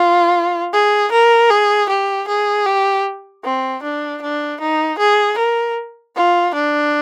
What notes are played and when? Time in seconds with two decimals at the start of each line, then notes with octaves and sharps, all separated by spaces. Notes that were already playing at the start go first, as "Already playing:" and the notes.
Already playing: F4
0.73 G#4
1.12 A#4
1.50 G#4
1.89 G4
2.28 G#4
2.66 G4
3.44 C4
3.83 D4
4.22 D4
4.61 D#4
4.99 G#4
5.38 A#4
6.16 F4
6.55 D4